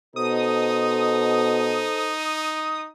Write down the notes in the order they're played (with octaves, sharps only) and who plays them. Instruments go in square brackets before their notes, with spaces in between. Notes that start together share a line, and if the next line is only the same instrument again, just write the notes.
[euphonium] B2 [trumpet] D#4 [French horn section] A4 C5 [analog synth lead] D#6